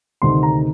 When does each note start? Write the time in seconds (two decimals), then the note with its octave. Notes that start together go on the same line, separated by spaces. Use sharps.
0.22 D2 C3 D#3 C6
0.43 A#5